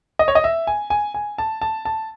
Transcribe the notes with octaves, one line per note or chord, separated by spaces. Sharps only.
D#5
C#5
D#5
E5
G#5
G#5
G#5
A5
A5
A5